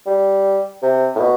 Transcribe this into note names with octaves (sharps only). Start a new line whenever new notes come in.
G3
C3
A2
B2